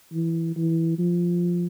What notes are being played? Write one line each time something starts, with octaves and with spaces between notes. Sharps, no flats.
E3
E3
F3